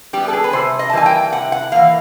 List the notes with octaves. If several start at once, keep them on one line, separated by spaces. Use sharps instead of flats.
G3 B3 G4
A4
G#4
B4
C3 C5
D#5
A5
E3 G3 A#3 G#5
G5
C3 F#5
F#5
E3 G3 A#3 F5